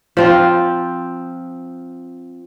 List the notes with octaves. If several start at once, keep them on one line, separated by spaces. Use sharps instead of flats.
F3 C4 F4